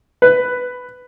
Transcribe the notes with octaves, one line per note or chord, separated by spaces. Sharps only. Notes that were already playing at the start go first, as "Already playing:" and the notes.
B4